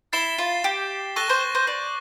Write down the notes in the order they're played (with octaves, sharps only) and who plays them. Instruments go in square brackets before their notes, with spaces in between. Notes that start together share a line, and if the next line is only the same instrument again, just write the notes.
[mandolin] E4 [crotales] A6 C7 E7 G7
[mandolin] F4
G4
[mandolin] A4 [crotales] C#6 F#6 A#6 D#7 G7
[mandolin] C5
C5
D5